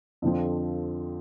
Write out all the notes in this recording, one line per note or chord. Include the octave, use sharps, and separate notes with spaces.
F2 D3 F3 C4